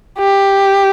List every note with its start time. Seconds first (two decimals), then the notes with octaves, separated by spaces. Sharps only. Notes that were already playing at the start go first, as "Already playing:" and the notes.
0.19 G4